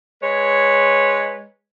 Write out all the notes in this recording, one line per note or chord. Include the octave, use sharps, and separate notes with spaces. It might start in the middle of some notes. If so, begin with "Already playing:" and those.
G#3 B4 C#5